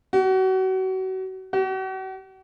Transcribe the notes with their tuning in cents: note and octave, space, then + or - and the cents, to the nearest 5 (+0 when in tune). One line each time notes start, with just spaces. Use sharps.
F#4 +30
F#4 +40